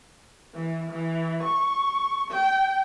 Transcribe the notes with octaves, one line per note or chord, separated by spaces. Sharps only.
E3
E3
C#6
G5